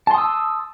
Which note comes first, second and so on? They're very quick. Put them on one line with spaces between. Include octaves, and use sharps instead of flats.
A5 C6 D#6 E6